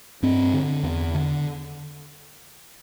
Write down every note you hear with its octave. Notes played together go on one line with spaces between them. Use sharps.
G2 C4
D3
E2
D3